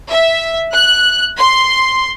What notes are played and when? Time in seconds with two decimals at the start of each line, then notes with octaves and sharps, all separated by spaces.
0.11 E5
0.73 F#6
1.37 C6